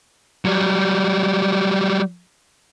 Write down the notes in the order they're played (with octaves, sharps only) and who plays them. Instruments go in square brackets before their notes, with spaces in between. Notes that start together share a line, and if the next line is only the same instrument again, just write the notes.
[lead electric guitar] F#3 G3